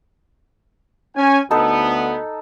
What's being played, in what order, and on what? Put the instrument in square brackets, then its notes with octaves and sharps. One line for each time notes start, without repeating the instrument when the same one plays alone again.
[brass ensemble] C#4 G#5
[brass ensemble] D2 B3 [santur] D#4 A4